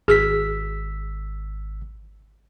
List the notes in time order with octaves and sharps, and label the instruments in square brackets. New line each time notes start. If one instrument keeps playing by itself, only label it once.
[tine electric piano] G#1 E6 B6 [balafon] G#4